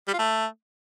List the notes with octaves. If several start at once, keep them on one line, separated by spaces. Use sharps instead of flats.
G3
F4
A3